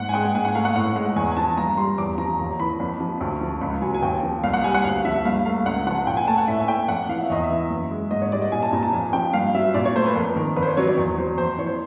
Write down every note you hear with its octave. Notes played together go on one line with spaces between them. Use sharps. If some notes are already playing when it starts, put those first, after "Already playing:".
Already playing: G#2 F#5
G#5
G#3 G5
G#2 G#5
F#5
A3 F5
F#5
A2 F#5
G#3 F#5
E2 G#5
G#5
F3 A5
G2 A#5
G3 C6
E2 D6
F3 A#5
D#2 A#5
E3 B5
F2
F3
D2
F3
C#2 B5
F#3 G#5
G#5
D#2 G5
F3
C2 F5
F#5
G3 G#5
F#5
D2 F5
F3 E5
G2 F5
A3 F5
C#2 F#5
F3 F#5
A#2 G5
G#5
A3 A5
F#5
A2 E5
G#5
A3 G5
F2 F#5
E3 F5
E5
E2 D#5
E5
E3
F#2
G#3
G#2 D#5
C#5
G3 D5
D#5
A#2 G#5
A5
A#2 A#5
A5
F2 G#5
F3 G5
G2 F5
F#3 E5
A#2 D5
C#5
A3 C5
B4
F2 A#4
D#3 A#4
F2 B4
C5
C#5
F#3 C#5
D5
E2 C#5
F#3 C5
F2 C5
E3 C#5
C5